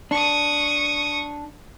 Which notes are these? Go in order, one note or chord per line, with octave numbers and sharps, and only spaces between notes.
D4 C#6 D#6